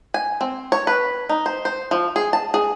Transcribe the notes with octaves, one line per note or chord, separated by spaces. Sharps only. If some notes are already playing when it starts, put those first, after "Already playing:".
G#5
C4
C#5
B4
D#4
C5
C5
F3
G#4
A5
G#4